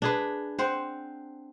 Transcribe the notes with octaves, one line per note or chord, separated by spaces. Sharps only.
D4 G#4 B4
C4 C5 F#5